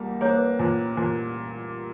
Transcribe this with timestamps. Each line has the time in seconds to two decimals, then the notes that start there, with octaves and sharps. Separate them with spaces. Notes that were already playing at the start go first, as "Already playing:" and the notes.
Already playing: C2 G3 A#3
0.21 A#3 C#5
0.30 C5
0.38 B4
0.46 C5
0.59 A#2 C5
0.97 A#2 C5